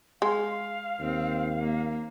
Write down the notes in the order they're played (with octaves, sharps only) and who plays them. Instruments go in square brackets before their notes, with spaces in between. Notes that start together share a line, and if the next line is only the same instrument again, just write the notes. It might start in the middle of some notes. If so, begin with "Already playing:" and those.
[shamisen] G#3 [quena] F5
[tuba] D#2 [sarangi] C4
[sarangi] A#3